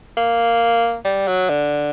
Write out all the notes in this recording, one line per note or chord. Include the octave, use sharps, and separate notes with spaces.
A#3
G3
F#3
D3